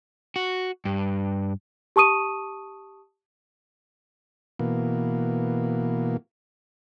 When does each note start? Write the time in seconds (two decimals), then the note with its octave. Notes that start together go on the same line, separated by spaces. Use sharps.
0.36 F#4
0.85 G2
1.96 G4 A5 C#6 D#6 D#7
4.59 B2 E3 A#3